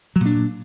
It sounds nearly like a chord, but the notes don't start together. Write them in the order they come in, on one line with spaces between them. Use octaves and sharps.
F#3 A#2 D4